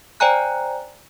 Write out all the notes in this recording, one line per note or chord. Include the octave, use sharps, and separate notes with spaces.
C5 D5 G5 G#5 A#5 F#6